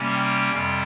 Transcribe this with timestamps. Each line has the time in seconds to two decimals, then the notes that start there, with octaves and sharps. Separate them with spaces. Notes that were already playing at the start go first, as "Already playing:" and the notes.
Already playing: C3 G3 A#3 C#4
0.13 G5
0.51 F2 C3 G3